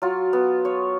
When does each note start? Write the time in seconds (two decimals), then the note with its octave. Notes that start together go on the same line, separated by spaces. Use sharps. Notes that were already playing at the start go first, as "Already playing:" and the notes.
0.02 F#3 F4
0.33 B3
0.65 C#5